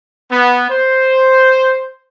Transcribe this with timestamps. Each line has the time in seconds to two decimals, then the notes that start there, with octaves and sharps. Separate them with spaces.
0.30 B3
0.69 C5